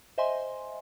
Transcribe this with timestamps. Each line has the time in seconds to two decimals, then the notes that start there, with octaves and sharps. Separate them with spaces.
0.18 C5 D#5 E5 G#5 C6